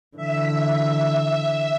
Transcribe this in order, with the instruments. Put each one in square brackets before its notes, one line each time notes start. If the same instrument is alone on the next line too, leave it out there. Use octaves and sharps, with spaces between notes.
[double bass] D3 E3 [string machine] E5